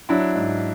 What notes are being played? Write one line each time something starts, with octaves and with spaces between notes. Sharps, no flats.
F#3 D4 E4
G#2